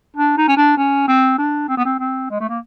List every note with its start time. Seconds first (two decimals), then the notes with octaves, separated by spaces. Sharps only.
0.17 D4
0.38 D#4
0.48 C#4
0.57 D4
0.78 C#4
1.08 C4
1.38 D4
1.69 C4
1.77 B3
1.85 C4
2.00 C4
2.30 G#3
2.40 A3
2.50 A#3